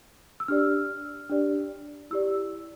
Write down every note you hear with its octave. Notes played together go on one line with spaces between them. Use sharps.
E6
D4 G4 D5 F6
D4 G4 D5
E4 G4 D5 E6